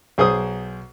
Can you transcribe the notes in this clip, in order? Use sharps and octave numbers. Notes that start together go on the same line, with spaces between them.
B1 G#4 C5 D#6